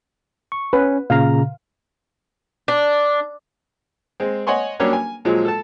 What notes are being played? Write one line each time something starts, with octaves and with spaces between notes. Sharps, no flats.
C#6
C#4 B4
A#2 C#3 F5 A#5
D4
G#3 C4
C#5 D#5 F#5 G#5 C6 C#6
F#3 G3 A#3 C#4 D4 C#5
G#5
A#2 F3 F#3 G#3
A4 A5